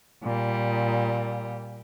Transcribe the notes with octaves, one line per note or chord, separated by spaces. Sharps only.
A#2 G3